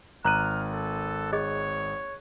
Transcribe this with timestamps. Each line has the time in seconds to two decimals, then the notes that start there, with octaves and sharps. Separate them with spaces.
0.25 G#1 A#5 F6 F#6 D#7
0.70 A4
1.33 G#4 C#5 D#5